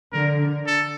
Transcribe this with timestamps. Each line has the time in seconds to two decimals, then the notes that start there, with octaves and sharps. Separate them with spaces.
0.13 D3 A#4
0.67 A4